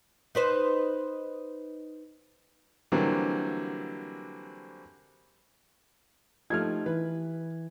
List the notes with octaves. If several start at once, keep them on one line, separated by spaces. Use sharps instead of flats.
D#4 B4 C5
D3 E3 F#3 G3 A#3 C4
F3 A3 D#4 G4 F6 G#6
E3 B4